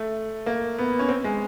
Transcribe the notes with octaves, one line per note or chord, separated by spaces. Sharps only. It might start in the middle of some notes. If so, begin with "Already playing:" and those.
Already playing: A3
A#3
B3
C#4
C4
G#3